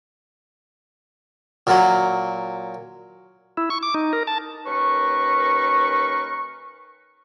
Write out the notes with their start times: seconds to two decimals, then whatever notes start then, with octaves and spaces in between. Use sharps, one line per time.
1.67 A#2 F#3
3.57 E4
3.70 C#6
3.83 D6
3.94 D#4
4.13 A#4
4.27 A5
4.66 D#2 C#4 A#4 B4 C#6